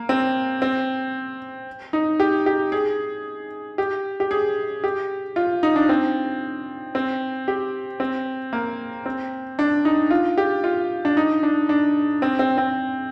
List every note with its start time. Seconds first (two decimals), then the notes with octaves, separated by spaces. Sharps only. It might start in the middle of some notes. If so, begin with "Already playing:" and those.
Already playing: A#3
0.09 C4
0.62 C4
1.93 D#4
2.20 G4
2.46 G4
2.72 G#4
3.78 G4
4.20 G4
4.31 G#4
4.84 G4
5.36 F4
5.63 D#4
5.76 D4
5.89 C4
6.95 C4
7.48 G4
8.00 C4
8.53 A#3
9.06 C4
9.59 D4
9.85 D#4
10.11 F4
10.38 G4
10.64 F4
11.05 D4
11.17 D#4
11.43 D4
11.69 D4
12.22 C4
12.39 C4
12.58 C4